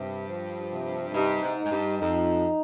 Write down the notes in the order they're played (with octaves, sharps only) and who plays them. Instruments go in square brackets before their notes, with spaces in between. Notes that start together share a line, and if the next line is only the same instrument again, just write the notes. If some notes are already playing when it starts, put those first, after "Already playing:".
Already playing: [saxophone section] G2 [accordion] C3
[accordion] F3
C3
[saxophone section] G2 [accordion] D#4
[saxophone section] G#2
[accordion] D#4
[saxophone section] G#2
G2
[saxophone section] F2 [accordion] D#4